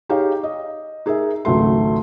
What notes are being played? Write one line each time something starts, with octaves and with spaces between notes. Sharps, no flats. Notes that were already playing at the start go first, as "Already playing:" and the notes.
D#4 G4 G#4 C#5 F5
D#5
D#4 G#4 A#4 E5
G#1 C#2 F#3 A3 C6